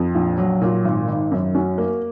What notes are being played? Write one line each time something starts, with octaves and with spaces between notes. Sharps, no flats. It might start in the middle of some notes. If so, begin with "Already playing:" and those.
Already playing: F2
A#1
F#3
A#2
G#1
D#3
F#2
C#4 F#4
A#3